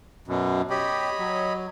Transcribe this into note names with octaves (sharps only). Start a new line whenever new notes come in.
F#2 B2
G4 C#5 D#5 B5
F#3